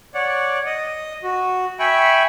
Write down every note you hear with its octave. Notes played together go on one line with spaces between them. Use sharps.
C#5 D5 F#5
D#5
F#4
E5 G5 G#5 B5 C#6